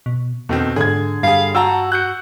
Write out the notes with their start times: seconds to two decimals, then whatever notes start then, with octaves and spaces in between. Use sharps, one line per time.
0.06 B2
0.49 E2 B2 D3 D#3 C4
0.76 G#2 D3 G#4 G#6
1.23 G2 G3 G#4 F5
1.55 F#4 G5 A5 A#5 E6
1.92 F#4 F#6 G6 C#7